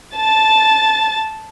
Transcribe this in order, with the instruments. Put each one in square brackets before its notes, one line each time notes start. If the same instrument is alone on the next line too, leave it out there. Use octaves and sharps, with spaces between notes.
[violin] A5 A6